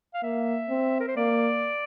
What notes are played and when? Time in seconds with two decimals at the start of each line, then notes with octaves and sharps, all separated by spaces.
0.14 F5
0.22 A#3 E5
0.69 C4
1.00 A#4
1.08 C5
1.16 A#3 D5